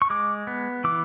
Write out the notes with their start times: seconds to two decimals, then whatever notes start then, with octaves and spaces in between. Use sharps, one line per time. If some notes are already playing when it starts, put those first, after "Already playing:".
0.02 C#6
0.10 G#3 D6
0.47 B3
0.84 E3 D6